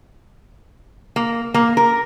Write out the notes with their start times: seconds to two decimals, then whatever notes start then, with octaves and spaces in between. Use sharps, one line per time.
1.16 A#3
1.54 A#3
1.77 A#4